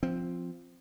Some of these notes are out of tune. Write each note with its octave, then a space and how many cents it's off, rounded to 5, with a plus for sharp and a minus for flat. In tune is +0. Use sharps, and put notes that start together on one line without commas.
F3 +0 C4 +0